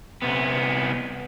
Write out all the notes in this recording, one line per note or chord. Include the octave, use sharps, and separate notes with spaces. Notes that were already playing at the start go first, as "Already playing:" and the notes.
C2 B3